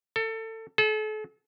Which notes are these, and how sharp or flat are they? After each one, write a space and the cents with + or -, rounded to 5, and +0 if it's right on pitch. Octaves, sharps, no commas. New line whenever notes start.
A4 +25
A4 -40